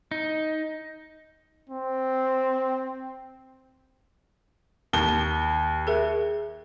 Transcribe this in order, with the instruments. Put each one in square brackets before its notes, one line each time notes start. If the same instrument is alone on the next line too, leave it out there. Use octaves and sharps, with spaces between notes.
[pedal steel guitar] D#4
[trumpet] C4
[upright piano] D#2 G7
[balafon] G#4 A#4 E5